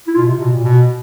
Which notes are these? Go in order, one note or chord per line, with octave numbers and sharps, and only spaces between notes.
E4
B2 F4
C3
B2
A#2
B2